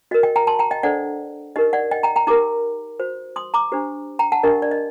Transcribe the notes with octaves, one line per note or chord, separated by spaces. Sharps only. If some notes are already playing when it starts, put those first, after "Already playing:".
F#4 A#4 D#5
D#5 G5
G5 A#5
A5 C6
G5 A#5
D#5 G5
D4 A4 C5 D5 F#5
D#4 G4 A#4 D#5
D5 F#5
D#5 G5
G5 A#5
G5 A#5
D#4 G4 A#4 A#5 D6
F#4 C5
C6 D#6
A#5 D6
D4 G4 C5
G5 A#5
F#5 A5
D4 G4 A#4 D#5
D5
D#5